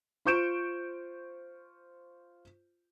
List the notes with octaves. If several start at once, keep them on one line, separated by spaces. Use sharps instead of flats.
F4 C5 C#6 G6 D7 E7